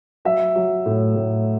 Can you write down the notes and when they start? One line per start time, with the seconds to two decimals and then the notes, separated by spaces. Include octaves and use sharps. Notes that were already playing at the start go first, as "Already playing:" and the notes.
0.25 F#3 E5
0.55 F#3
0.86 A2
1.16 A2